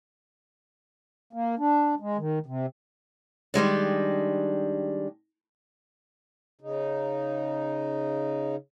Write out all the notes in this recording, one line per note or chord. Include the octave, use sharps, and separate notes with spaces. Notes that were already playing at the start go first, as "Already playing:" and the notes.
A#3
D4
G#3
D#3
C3
D#3 G3 G#3 D4
C#3 D#4